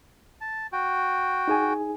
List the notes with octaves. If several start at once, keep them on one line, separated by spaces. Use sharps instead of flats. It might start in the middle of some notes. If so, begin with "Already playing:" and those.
A5
F#4 G5
D#4 G#4 G#5